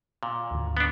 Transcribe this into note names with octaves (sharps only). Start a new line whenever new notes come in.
A#2
D2 G#2 D3
B3 D4